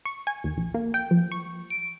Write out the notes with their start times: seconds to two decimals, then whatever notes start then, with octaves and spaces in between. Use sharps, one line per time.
0.05 C#6
0.27 G#5
0.44 D#2
0.57 A#1
0.74 A#3
0.94 G5
1.11 F3
1.32 C#6
1.70 D7